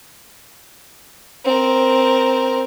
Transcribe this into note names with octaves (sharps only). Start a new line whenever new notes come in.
C4 A#4